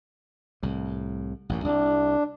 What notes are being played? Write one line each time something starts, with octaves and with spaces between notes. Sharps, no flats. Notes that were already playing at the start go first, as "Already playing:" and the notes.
C2 A2
A1 F#2 A#2
C2 D4